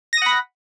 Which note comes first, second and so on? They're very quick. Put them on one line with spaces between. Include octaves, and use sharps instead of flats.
A#6 D#6 F#5 B5